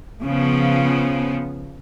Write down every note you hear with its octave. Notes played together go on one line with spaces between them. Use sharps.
C#3 F3 B3